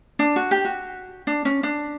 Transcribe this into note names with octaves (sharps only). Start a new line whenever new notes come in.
D4
F#4
G4
F#4
D4
C#4
D4